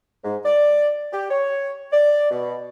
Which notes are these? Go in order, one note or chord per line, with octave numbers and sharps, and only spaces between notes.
G#2
D5
G4
C#5
D5
B2